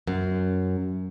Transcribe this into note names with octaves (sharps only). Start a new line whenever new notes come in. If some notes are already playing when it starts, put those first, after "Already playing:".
F#2